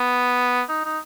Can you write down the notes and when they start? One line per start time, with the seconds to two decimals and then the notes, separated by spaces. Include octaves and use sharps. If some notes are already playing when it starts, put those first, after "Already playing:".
Already playing: B3
0.69 D#4
0.85 D#4